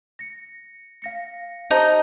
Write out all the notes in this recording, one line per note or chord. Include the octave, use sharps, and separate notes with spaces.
A#6 C#7
F5 A#6 C#7
D#4 G4 C5 A5